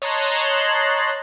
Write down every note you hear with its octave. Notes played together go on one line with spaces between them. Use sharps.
C#5 D#5 A5 A#5 C6 F#6